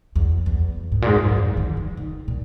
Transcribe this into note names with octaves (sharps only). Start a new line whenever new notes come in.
E2
E2
G#2
A#2
G#2
F#2
E2
D#3
E3
D#3
A#2